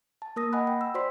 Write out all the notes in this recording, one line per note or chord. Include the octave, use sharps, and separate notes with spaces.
A5
A#3 A#4 D#6 A#6
D#5 F#5 G#5 B5 F#6
G5
E6
F#4 C5 D5 C6 B6